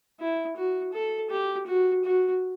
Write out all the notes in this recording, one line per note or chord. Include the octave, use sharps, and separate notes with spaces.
E4
F#4
A4
G4
F#4
F#4